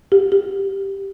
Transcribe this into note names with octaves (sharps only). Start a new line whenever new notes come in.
G4
G4